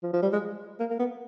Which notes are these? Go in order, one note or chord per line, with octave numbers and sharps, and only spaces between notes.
F3
F3
G3
G#3
A#3
A#3
B3